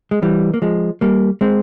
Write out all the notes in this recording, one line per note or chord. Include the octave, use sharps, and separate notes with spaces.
G#3
E3 G3
A#3
F3 G#3
G3 A#3
G#3 C4